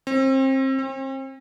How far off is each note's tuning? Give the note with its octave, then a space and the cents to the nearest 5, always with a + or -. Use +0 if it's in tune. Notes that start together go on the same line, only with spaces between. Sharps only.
C4 +30
C4 +40